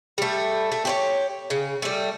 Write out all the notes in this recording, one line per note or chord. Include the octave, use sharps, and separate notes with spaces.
G3 A3
A3
G4 C5 C#5
C#3
G3 A3